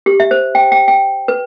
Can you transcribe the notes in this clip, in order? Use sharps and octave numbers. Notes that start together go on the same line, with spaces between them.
G4
E5
C5
G5
G5
G5
B4